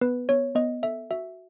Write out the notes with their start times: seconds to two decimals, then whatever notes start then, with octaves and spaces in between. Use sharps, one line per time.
0.01 B3 B4
0.29 B3 C#5
0.55 B3 D#5
0.83 A4 E5
1.11 F#4 E5